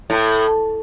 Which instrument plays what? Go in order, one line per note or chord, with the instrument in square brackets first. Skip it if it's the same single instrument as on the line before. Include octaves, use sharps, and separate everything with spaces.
[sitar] A2